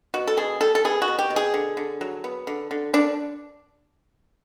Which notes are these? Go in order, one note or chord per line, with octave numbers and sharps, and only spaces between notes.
B2 F#4
A4
B2 G#4
G3 A4
A4
B3 G#4
F#4
B2
G4
B2
G#4
D3
D3
F#3
B3
D3
D3
D3 D4